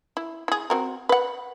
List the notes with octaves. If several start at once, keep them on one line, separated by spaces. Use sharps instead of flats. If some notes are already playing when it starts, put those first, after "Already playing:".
E4
E4 G#4
C4 F#4 A#4
B4 F#5